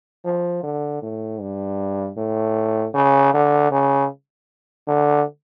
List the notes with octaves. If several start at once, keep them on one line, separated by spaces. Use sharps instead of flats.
F3
D3
A2
G2
A2
C#3
D3
C#3
D3